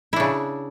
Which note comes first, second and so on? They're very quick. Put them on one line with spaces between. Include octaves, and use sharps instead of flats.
E4 D4 C#3